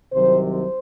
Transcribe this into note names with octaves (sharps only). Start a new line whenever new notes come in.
C2 C3 D#3 F#3 C5
C5